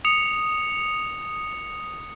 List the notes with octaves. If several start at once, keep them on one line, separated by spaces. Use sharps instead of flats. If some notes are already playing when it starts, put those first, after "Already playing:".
D#6 C#7 F7